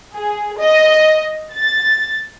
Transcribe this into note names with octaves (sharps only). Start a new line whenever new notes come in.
G#4
D#5
A6